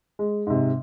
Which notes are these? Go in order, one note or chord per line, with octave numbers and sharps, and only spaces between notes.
G#3
G#2 C3